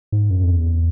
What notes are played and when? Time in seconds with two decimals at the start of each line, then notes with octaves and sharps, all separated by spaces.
0.12 G#2
0.30 F#2
0.43 F2
0.55 E2